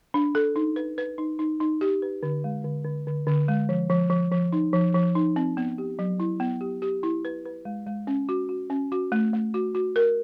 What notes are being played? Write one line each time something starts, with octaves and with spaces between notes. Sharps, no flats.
D4
A4
D#4
B4
B4
D#4
D#4
D#4
G4
B4
D3
G#3
D3
D3
D3
D3
G#3
F3
F3
F3
F3
D#4
F3
F3
D#4
C4
B3
G4
F#3
E4
B3
G4
G4
E4
B4
B4
G#3
G#3
C#4
F#4
F#4
C#4
F#4
A3
A3
F#4
F#4
A#4